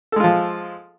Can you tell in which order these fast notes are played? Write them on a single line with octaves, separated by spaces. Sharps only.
A4 G#3 F4 F3